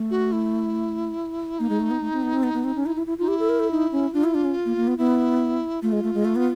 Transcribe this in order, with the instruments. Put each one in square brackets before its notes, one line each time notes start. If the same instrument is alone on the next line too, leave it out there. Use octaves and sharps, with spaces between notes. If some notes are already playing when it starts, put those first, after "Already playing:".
Already playing: [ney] A3
[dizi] F#4
E4
[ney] A#3 [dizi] D#4
[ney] G#3
A3
B3
A3
C4
B3
C4
B3
B3
C4
C#4
E4
E4
E4
[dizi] D#4 [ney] F4
[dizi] E4 [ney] G4
[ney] A4
A#4
A4
D#4
C#4
[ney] D4 [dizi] F4
[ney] E4
D4
C#4
A#3
A#3
B3
[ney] B3 [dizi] E4
[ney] A3 [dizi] F4
[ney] G#3
A3
G#3
A3
B3